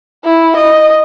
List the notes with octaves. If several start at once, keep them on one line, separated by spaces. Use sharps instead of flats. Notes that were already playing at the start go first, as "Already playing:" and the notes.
E4
D#5